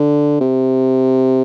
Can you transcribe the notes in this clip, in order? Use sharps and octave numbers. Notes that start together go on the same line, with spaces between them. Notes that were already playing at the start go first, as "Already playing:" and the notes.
Already playing: D3
C3